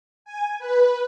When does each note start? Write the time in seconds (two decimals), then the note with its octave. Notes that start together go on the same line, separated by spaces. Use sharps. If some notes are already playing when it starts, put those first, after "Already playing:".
0.25 G#5
0.59 B4